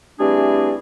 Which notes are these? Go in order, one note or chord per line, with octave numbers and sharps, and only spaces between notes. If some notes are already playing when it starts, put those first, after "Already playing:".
E3 G3 A3 C4 D4 G#4